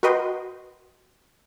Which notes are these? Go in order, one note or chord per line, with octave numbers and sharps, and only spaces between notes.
F#4 A#4 B4 D#5 G5 C6